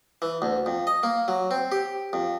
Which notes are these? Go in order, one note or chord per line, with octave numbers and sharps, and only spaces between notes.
E3
D2
F2
D#5
A#3
F#3
C4
G4
F2